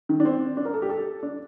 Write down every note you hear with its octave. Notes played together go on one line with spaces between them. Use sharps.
D#3
D4
C4
D4
A#4
A4
G4
A4
D4